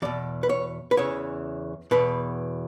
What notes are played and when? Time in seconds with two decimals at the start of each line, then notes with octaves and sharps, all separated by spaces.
0.02 E2 B2 D5
0.43 B4
0.49 C#5
0.91 B4
0.97 E2 C#3 E3 C#5
1.91 E2 B2 B4